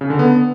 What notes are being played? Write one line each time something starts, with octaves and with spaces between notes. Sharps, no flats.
C#3
D3
B3